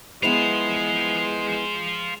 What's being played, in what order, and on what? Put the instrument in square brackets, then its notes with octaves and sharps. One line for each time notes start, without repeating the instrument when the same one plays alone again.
[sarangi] G#3 [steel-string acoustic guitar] B3 E4 B4 [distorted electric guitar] F4 C5 [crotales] F7